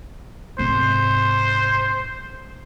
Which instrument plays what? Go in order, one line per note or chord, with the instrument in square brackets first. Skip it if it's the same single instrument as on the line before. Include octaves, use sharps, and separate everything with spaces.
[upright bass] G#2 C3 [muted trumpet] C5